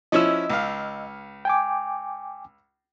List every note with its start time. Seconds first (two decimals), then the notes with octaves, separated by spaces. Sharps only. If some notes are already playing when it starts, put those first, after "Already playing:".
0.12 F3 C#4 E4 D#5 E6
0.50 C#2 F5
1.45 G5 G#5 D6